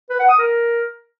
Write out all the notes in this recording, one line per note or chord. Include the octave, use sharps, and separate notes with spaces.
B4
F#5
D#6
A#4